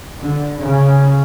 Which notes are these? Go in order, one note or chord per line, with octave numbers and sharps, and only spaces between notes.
D3
C#3